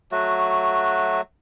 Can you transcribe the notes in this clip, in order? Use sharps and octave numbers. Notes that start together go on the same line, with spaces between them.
F#3 A3 F#4